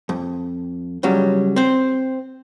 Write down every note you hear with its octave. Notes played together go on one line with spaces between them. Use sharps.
F2
C#2 C#3 F#3 G3
C4 C5